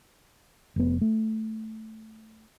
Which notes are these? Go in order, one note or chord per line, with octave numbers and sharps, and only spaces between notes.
F1 B3
A3